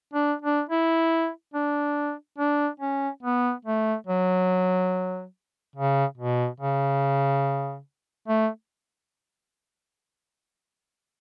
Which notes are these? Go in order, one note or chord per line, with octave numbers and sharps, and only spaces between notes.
D4
D4
E4
D4
D4
C#4
B3
A3
F#3
C#3
B2
C#3
A3